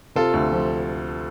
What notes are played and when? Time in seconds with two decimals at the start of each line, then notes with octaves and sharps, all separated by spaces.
0.15 C3 F4 A4
0.34 D2
0.52 F3